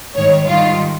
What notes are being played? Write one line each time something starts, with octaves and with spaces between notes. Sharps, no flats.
G#2 D#3 G3 C#5
G#2 D#3 G3 F4